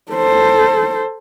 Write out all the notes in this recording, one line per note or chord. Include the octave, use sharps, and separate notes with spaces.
A4 C5